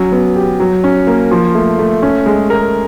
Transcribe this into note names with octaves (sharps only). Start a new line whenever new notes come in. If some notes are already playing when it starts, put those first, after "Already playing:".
Already playing: F#3 C#4
B3
G4
F#3
C#4
A#3
F3
A3
A3
C#4
G#3
A#4